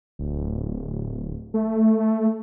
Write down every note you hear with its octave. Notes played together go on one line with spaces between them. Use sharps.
D1
A3